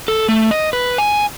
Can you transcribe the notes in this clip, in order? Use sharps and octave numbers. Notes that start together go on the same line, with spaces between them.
A4
A3
D#5
B4
G#5